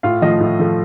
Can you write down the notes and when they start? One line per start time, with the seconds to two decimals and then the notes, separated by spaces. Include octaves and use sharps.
0.03 A2 F4 F5
0.22 F3 A3 D#5
0.41 A2
0.59 F3 A3